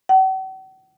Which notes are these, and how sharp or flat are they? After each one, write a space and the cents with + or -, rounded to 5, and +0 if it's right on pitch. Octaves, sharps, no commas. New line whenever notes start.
F#5 +45